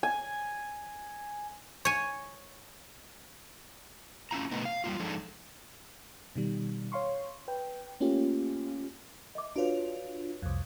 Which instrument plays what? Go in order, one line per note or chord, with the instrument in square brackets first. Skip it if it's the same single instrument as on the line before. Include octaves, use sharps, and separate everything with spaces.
[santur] G#5
[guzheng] C#5 G#5
[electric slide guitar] C#4 E4 F4 A#5
B2 D3 A3 B3 D#4
F5
G3 G#3 A#3 F4
F3 G#3 D4 D#4 G#4 A4
[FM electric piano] B2 D#3 G3
C#5 F5 C6 C#6
B4 G5
A3 A#3 C#4 F4 G4
[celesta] D#5 E5 D6
[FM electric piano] D4 F4 [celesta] F#4 B4 C#5
[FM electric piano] C2 F2